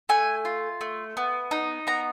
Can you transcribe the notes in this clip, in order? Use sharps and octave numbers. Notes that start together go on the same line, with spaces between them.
A3 G#5
F4
A3
B3
D#4
B3 A#5